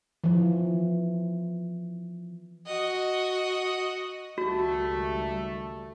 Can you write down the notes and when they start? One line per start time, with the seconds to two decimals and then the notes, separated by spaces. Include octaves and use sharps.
0.24 E3 F3
2.66 F#4 D#5
4.38 C#2 D#3 G3 A3 F#4